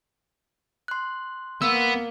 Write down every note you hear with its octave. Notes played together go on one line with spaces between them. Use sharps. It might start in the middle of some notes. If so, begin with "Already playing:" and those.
C6 F#6
A#3 B3 E6